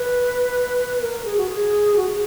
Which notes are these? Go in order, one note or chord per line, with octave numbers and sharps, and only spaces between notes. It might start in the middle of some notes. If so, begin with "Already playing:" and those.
Already playing: B4
A#4
G#4
F#4
G#4
F#4
G#4